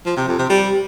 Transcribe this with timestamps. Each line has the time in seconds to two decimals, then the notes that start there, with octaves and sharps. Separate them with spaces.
0.06 F3
0.17 C3
0.28 F2
0.39 C3
0.50 G3